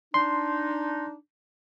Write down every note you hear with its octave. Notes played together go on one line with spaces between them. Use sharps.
D4 D#4 C6